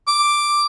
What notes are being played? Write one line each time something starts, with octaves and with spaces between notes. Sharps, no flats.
D6